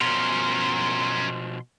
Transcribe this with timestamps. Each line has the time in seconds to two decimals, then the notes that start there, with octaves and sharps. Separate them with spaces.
0.01 B2 F3 C#4 A#4 C6